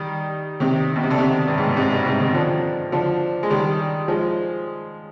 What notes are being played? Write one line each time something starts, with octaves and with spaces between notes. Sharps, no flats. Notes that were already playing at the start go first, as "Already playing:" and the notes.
Already playing: D#3 G3
C3 D#3
B2
C3
D3
C3 D#3
G2
G#2
B2
G#2 C3
G2 B2
G#2 C3
C3 D#3
D3 F3
D3 F3
G#3
D#3 G3
F3 G#3